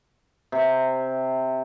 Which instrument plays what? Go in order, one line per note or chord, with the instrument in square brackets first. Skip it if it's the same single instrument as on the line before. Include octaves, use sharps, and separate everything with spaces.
[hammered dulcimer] C3